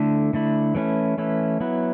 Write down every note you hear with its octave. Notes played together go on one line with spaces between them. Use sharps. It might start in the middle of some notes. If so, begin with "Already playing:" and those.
Already playing: D3 A3 E4
D3 A3 E4
E3 A3 C#4 E4
E3 A3 C#4 E4
F#3 B3 E4